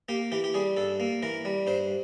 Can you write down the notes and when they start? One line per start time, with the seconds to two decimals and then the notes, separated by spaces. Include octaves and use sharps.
0.09 A#3 G4
0.32 E3 G4
0.44 G4
0.54 G3 G#4
0.77 G2 A4
1.00 A#3
1.23 E3 A#4
1.45 G3
1.67 G2 C5